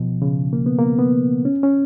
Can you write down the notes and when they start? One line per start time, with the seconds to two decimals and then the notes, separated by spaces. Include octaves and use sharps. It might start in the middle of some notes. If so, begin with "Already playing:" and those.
Already playing: B2 F3
0.22 C#3
0.53 A#3
0.66 B3
0.79 A#3
0.99 B3
1.45 C#4
1.63 C#4